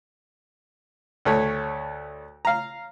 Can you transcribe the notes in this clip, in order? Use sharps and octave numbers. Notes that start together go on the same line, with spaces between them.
D2 A3 C#5
F5 A#5